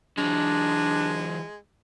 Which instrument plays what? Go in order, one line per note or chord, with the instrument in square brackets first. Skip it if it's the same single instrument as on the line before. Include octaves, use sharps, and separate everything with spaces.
[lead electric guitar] E3 F#3 [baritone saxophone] G#3 [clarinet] D4